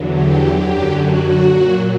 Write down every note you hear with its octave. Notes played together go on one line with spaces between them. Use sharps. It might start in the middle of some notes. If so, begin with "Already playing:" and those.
Already playing: E2 D3 F#3
G4
F#2 D3 F#3 G4
F#4
A#2 F#3